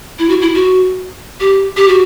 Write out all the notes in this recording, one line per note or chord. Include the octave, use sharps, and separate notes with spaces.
E4
F#4
E4
F#4
G4
G4
F#4